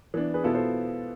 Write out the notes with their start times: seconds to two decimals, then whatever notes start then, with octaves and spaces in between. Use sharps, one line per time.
0.14 E3 B3 D4
0.34 G#4 B4
0.44 B2 B3 E4 F4 A4
0.54 A4 C5